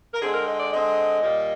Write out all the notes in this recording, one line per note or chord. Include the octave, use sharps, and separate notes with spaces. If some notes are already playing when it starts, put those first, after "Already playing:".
A#4
D3 G#3 C4 G#4
A#4
D#5
D5
D3 G#3 C4 D#5
A#2 G3 A#3